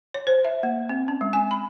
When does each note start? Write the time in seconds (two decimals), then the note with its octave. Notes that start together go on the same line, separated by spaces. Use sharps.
0.14 C#5
0.27 C5
0.45 E5
0.63 A#3
0.89 C4
1.08 C#4
1.21 G#3
1.33 G#5
1.51 B5